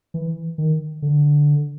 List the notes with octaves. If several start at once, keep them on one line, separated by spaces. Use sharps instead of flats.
E3
D#3
D3